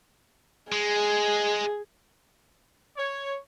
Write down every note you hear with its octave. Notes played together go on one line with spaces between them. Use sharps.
G#3 G#4
C#5